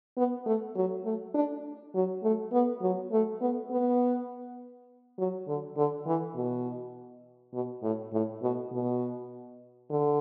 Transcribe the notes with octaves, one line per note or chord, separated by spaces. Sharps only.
B3
A3
F#3
A3
D4
F#3
A3
B3
F#3
A3
B3
B3
F#3
D3
D3
E3
B2
B2
A2
A2
B2
B2
D3